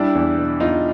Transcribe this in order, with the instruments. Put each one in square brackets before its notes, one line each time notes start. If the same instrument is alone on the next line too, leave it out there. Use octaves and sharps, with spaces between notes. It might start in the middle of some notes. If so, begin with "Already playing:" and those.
Already playing: [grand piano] G3 D4 E4
E2
B2
E2 D#4 F4